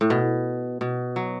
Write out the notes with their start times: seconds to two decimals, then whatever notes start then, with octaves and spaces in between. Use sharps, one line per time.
0.01 A2
0.10 B2
0.81 B2
1.16 F#3